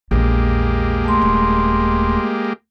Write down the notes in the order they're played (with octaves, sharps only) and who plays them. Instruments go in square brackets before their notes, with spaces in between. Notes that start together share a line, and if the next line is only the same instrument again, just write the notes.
[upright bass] A#1 E2 [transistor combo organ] G#3 A#3 G4
[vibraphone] A3 C6
[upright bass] D#1